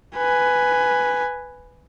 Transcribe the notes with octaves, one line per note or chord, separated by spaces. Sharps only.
B4 G#5